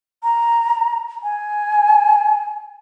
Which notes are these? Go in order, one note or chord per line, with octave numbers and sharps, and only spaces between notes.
A#5
G#5